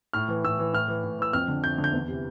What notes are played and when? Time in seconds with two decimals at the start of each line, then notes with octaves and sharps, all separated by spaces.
0.13 A2 F6
0.28 E3
0.44 A2 E6
0.59 E3
0.73 A2 F6
0.88 E3
1.04 A2
1.19 E3 E6
1.33 F2 F6
1.48 D3
1.64 F2 G6
1.78 D3
1.84 G6
1.93 E2
2.08 C3 E3